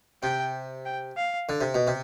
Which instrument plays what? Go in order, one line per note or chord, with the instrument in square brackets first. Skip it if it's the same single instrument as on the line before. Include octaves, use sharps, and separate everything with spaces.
[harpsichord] C3 [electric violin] G5
[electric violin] G5
F5
[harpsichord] D3
C3
B2
C3